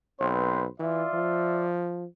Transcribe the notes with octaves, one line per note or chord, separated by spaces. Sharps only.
B1 C4 B4 C5
E3 F4 D5 E5
F3